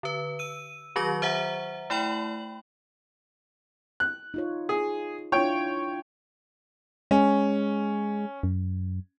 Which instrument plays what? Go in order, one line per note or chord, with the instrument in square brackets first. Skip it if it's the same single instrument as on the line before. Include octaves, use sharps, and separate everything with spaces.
[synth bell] D3 B4
E6 D#7
D#3 F#3 F#4 C#6 A#6
C5 E5 F#5 A#5
A3 E4 G5 B5 F#7
[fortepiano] F#6
[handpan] D#4 F4 C#5
[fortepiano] G#4
[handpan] D4 E4 F4 [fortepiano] C#5 G5
[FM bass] G#3 [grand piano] C#4
[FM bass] F#2